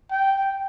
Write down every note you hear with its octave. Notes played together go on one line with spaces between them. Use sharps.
G5